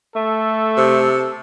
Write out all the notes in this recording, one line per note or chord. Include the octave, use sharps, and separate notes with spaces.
A3 A4
C3